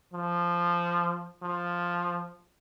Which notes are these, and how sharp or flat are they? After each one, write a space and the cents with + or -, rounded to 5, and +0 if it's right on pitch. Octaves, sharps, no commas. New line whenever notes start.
F3 -10
F3 +5